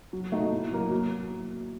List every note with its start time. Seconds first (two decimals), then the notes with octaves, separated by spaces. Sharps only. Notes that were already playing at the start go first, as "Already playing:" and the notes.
0.13 F#3
0.32 A3 D#4 F#4
0.52 A2
0.71 F#3 A#3
0.91 F#3